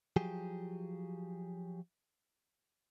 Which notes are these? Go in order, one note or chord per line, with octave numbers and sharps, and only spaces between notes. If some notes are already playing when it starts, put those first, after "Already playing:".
F3 F#3 G4 G#4